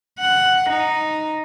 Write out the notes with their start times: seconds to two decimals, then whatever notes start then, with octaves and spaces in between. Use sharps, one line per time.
0.20 F#5
0.70 D#4